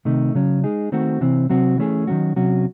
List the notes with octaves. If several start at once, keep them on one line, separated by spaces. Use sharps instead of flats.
C3 D#3 A3 D#4
C#3 F#3 C#4
G#3 D#4 G#4
D#3 A3 C4 F#4
C3 E3 C4
C3 F#3 C4 F#4
E3 A3 C#4 G#4
D#3 F#3 C#4 F#4
C3 F#3 C#4 F#4